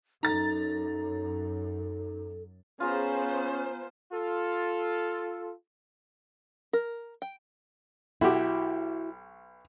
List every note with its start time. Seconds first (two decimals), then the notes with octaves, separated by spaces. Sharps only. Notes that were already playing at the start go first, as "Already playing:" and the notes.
0.23 F#2 D#4 A4 A#5 A6
2.80 B3 C#4 F4 G#4 C5 A#5
4.12 F4 A4
6.73 A#4
7.22 G5
8.21 B1 E4 F#4 G4